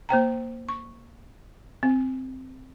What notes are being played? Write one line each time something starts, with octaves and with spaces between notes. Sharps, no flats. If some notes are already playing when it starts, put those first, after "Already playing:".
A#3 C5 G5 A#5
C#6
C4